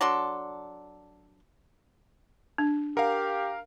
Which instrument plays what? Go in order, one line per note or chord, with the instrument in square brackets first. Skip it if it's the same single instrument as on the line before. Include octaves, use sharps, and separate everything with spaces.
[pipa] F#3 D4 A4 C6
[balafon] D4
[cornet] G4 [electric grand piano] A#4 F5 [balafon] F#5